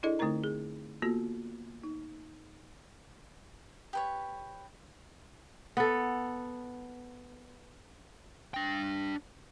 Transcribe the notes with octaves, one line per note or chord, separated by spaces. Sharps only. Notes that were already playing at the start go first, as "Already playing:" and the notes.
D4 E4 G#4 A4 D5 D#5
D3 A3 C4 D#4 A#4 A#5
G#4
A#3 B3 F4 F#4 A4
D#4
G4 B4 C#5
B3 A4
D4 G5